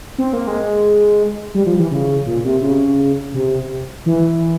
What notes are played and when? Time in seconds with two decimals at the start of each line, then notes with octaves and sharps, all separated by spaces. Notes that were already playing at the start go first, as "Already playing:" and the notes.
0.18 C4
0.33 A#3
0.47 G#3
1.55 G3
1.66 F3
1.79 E3
1.91 C#3
2.26 A#2
2.45 C3
2.62 C#3
3.34 C3
4.06 E3